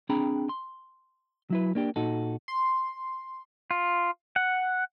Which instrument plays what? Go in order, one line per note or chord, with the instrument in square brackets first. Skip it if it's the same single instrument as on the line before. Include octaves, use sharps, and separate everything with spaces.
[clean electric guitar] C4 D4 G#4 G5 A#5 B5
C6
F#3 E4 B4
A#3 D4 G4
A#2 D#4 F#4 A4
[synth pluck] C6
[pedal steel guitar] F4
F#5